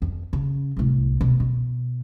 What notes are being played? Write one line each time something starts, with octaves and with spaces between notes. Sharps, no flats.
F2
C#3
D1 C2
B2
B2